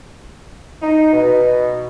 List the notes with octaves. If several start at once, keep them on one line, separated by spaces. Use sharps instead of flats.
D#4
B2